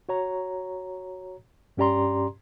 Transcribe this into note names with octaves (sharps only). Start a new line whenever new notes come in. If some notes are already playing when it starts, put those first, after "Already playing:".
F#4 C#5 A#5
G2 C#4 G4 D5 A#5 C6